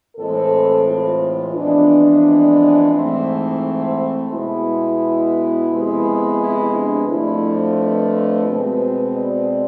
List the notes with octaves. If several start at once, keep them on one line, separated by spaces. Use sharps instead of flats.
A2 E3 G#3 C4 A4
F4
F2 E3 G#3 B3 D4
G#2 E3 A3 C4 E4
B2 G#3 B3 E4
F2 C3 G#3 B3
E4
D4
F2 D3 F3 A3 E4
B4
B2 G#3 C4
D5